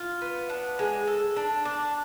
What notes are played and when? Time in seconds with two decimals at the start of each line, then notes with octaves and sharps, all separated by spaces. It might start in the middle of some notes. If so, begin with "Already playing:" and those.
Already playing: F4
0.22 B3
0.49 D4
0.79 G#3
1.07 A4
1.36 D4
1.65 D4